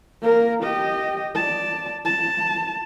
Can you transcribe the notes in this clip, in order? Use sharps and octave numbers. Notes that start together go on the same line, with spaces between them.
A#3 A#4
G4 D#5
D5 A5
A5